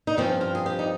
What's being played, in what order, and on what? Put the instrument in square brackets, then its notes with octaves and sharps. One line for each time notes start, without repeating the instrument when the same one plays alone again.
[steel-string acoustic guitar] D#4
G2 F3 C4 C#4
F4
G#4
G4
D#4